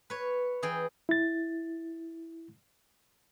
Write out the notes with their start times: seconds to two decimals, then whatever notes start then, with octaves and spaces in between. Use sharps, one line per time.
0.10 B4 C#5
0.62 E3 G#4 G5
1.09 E4 A6